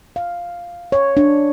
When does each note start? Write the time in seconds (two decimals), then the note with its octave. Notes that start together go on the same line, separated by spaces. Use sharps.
0.16 F5
0.92 C#5
1.17 D4